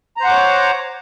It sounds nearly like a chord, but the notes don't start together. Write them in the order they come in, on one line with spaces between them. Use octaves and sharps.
A#5 C5 F#5 D6 C#5